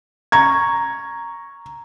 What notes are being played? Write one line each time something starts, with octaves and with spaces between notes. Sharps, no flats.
A#5 C#6 G#6